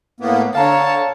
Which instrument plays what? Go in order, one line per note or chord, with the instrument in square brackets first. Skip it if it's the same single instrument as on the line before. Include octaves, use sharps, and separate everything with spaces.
[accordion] A2 A#3 B3
[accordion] D3 [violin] C#5 A5 [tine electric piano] F5 A#5